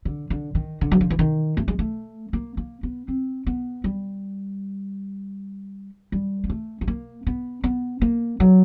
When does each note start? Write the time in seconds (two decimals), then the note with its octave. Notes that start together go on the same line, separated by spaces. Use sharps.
0.05 D3
0.30 D3
0.55 D#3
0.81 D3
0.92 F#3
1.01 F3
1.10 E3
1.19 D#3
1.57 A3
1.68 G#3
1.79 A3
2.33 A#3
2.57 A#3
2.83 B3
3.08 C4
3.46 B3
3.84 G3
6.12 G3
6.44 A#3
6.49 A3
6.81 A3
6.87 A#3
7.27 B3
7.64 B3
8.02 A#3
8.40 F#3